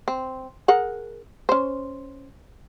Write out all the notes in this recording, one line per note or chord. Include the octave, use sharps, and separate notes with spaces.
C4
G#4 A#4 F#5
C#4 C5